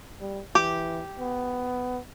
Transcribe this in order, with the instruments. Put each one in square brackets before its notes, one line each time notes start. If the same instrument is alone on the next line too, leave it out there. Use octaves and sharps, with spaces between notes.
[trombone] G3
[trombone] E3 [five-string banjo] G4
[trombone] B3